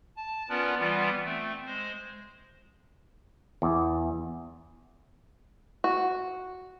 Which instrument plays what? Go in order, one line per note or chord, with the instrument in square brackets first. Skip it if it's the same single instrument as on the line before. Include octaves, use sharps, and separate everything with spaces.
[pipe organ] A5
B3 C#4 F4 A#4 B4 D5
E3 G3 B3 F4
A3 C4
G#3 C5
[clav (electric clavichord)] E2
[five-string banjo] F#4